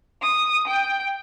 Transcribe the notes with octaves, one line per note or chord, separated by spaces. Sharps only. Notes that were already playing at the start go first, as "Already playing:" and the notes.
D#6
G5